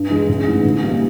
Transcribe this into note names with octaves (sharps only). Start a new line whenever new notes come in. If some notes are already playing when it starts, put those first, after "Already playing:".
Already playing: G2
E3 G#3
A1
G#2 E3 A3
D3
G3 A#3 D#4